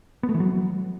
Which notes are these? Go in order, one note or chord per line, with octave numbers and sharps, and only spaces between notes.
B3
A3
E3
F#3